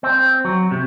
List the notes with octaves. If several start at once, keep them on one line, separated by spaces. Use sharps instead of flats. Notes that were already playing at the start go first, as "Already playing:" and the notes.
C4
F#3
C3